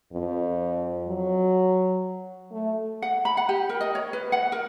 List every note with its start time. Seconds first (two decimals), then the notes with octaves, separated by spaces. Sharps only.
0.13 F2
1.08 F#3
2.52 A3
3.02 F#5
3.25 B5
3.37 F#5
3.49 G4
3.69 A#4
3.81 D#5
3.95 C#5
4.13 B4
4.32 F#5
4.52 A#4